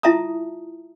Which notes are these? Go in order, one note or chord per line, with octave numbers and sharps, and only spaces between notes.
E4 F4 E5 A5 A#5 D#6